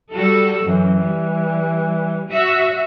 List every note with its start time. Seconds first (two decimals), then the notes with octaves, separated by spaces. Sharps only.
0.14 G3 F#4 A4
0.64 F#2 E3
1.01 G3
2.28 F#4 E5